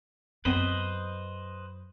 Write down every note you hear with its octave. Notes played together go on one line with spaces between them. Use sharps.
F#2 B3 C4 B4 C5 D#5 B6